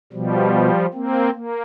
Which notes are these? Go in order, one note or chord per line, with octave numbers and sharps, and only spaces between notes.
B2 F3 G3
A#3 C4
A#3